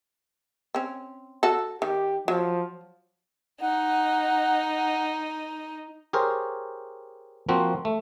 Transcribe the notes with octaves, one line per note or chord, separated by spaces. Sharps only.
C4 C#4
F#4 A4
D#3 G4
F3 F#3
D#4 F#5
G4 G#4 A#4 C5 C#5
F3 A#3 C4 F#4
A3